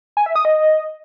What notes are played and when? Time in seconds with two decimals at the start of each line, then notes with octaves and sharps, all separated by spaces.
0.17 G#5
0.26 E5
0.36 D#6
0.45 D#5